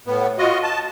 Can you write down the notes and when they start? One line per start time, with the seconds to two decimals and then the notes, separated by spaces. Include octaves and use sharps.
0.07 A2 B3
0.39 F4 F#4 D#5
0.63 A5